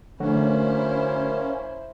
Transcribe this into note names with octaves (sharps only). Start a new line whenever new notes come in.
D3 F#3 A3 A#3 C#4 E4 F#4 C5